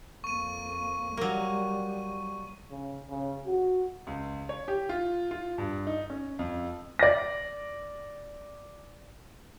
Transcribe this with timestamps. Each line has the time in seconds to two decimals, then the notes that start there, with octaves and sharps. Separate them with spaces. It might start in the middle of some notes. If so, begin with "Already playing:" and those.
0.24 F2 A#3 C#6 D#7
1.17 F#3 G3 A#3
2.71 C#3
3.10 C#3
3.46 F#4
4.07 C#2
4.49 C#5
4.68 G4
4.89 F4
5.31 F4
5.58 G2
5.87 D#4
6.10 C#4
6.39 F2
6.99 D5 A#6